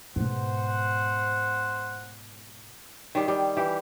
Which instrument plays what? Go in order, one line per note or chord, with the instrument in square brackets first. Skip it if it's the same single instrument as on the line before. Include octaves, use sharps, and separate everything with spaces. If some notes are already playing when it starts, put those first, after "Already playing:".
[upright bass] G#2 B2 [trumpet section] C5 F#5
[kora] D#3 G3
G3
E3 G4